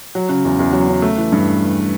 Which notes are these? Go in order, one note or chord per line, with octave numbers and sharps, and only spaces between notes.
F#3
C#3
E2
E2
F#3
C#3
A3
E3
G2